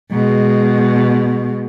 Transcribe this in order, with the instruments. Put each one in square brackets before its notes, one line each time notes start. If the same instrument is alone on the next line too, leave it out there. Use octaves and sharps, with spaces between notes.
[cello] B2 G#3